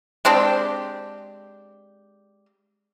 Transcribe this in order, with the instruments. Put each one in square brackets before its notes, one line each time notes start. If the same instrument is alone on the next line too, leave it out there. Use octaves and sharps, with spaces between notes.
[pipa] G#3 C4 D4 G4